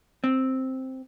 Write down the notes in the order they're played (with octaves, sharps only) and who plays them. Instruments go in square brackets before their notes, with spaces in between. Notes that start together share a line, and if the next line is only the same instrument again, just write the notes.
[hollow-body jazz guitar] C4